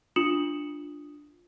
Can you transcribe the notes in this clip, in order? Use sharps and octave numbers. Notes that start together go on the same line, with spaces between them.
D4 F4 D#6 C#7 E7 F#7